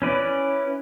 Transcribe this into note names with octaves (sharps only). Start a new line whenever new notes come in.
C#4 E4 B4 D5